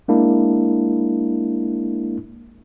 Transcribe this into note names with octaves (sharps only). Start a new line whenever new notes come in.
G#3 A#3 D4 E4